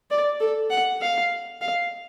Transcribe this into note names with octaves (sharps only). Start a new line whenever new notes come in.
D5
A4
F#5
F5
F5